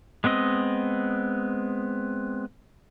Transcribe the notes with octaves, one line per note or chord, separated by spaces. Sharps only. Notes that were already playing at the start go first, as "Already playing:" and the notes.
G#3 B3 C4 D#5